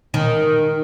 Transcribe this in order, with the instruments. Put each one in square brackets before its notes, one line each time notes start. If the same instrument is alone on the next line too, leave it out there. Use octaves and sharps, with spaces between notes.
[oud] D#3